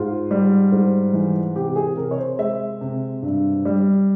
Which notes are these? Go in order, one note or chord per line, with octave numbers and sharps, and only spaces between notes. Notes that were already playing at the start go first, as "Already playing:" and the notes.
Already playing: G#2 F4
G3
G#2
E3
C3 G4
G#4
C3 A#4
C#5
C5
G#3 E5
C3
G2
G3